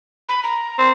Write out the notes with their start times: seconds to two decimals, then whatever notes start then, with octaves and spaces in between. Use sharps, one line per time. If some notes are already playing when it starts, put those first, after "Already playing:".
0.29 B5
0.43 A#5
0.78 C4